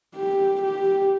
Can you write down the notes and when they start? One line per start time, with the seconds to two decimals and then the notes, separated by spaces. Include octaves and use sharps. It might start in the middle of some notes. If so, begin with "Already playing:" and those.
0.15 G4
0.62 G4